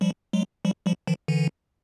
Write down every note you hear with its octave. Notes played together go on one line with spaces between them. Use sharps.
F3 G3
F#3 G#3
F3 G3
F3 G3
D#3 F3
D3 E3